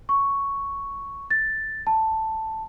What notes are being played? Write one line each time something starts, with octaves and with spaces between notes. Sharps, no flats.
C#6
A6
A5